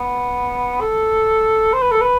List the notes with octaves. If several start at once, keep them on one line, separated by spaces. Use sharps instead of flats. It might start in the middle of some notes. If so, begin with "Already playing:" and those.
Already playing: B3
A4
C5
B4
A4
B4